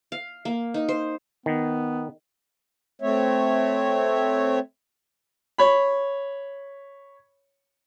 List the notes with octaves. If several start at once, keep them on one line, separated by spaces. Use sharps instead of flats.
F5
A#3
D#4
C5
D#3 B3
A3 C4 C#5 E5
C#5 B5